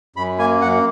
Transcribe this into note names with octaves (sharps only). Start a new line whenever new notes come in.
F#2 B5
A#3 G#5
F#2 F#5